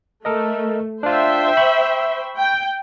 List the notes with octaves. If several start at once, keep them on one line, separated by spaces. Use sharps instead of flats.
A3 A4 A#4 D#5
D4 F4 C5 E5 G5
B5 C#6
G5